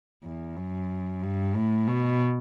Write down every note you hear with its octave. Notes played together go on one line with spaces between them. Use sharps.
E2
F#2
G2
A2
B2